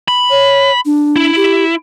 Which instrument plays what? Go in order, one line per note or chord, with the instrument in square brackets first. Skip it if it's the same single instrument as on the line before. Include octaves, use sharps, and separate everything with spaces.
[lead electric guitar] B5
[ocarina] C#5
D4
[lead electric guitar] E4
[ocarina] G4